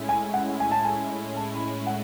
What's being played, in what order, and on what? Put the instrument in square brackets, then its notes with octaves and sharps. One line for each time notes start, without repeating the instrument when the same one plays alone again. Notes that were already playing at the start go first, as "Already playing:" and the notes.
Already playing: [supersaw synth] A2 G#3 C#4 E4
[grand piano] G#5
F#5
G#5
A5
G#5
A5
B5
F#5